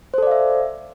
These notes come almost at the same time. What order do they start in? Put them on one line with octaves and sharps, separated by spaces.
C5 A4 D5 F5 E5